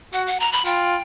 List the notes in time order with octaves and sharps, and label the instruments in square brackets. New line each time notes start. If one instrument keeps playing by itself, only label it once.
[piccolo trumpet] F#4 [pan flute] F#5
[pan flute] F#5
A#5
B5
[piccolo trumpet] F4 [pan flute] G5